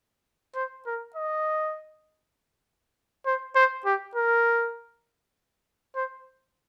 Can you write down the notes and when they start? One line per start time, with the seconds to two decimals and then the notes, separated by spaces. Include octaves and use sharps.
0.55 C5
0.86 A#4
1.15 D#5
3.26 C5
3.55 C5
3.85 G4
4.15 A#4
5.95 C5